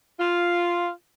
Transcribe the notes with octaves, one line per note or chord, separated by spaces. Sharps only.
F4